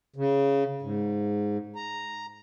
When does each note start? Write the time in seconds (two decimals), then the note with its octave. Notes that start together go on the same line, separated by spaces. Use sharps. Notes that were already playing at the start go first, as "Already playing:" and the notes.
0.16 C#3
0.82 G#2
1.76 A#5